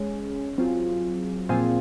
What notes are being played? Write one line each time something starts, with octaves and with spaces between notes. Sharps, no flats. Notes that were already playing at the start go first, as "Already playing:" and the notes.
Already playing: G#3 C#4 G#4
F#3 C4 F4 G#4
A#2 F3 C4 F4 G#4